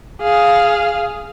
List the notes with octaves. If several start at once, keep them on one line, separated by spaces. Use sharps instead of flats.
G#4 F5